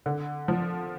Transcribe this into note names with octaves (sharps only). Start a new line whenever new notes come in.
D3
F3